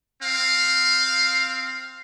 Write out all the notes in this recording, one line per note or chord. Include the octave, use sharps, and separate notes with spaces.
C4 F5